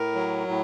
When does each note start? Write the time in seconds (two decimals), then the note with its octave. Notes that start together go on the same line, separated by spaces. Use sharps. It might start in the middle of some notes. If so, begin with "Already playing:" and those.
Already playing: A2 A#4
0.15 F#3
0.48 A2